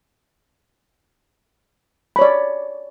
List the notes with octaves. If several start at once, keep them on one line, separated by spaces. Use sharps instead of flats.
C#5 D5 B5